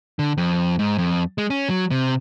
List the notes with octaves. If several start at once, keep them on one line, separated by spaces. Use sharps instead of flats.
D3
F2
G#2
F2
G#3
C#4
F#3
C3